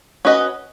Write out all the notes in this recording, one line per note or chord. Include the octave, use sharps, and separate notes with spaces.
C#4 F#4 B4 D#5